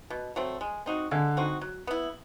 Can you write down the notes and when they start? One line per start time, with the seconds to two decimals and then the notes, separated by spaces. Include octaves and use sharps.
0.10 B2
0.36 F#3 A3 C4
0.61 G#3
0.86 C4 D#4 F#4
1.11 D3 G#3
1.37 C4 D#4 F#4
1.61 F#3
1.87 B3 E4